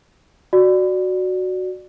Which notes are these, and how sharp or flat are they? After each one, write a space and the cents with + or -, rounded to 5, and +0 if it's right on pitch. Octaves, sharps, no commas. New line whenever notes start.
F#4 +0 D5 +10